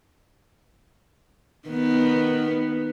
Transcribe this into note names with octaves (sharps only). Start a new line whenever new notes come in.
D#3 B3